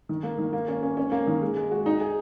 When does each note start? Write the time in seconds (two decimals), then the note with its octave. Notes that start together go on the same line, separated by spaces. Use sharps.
0.09 D#3
0.23 A#3
0.38 D#3
0.53 A#3
0.68 C#4
0.83 C#4
0.97 C#4
1.12 A#3
1.27 D#3
1.42 G#3
1.57 G#3
1.71 F#4
1.86 D#4
2.01 G#4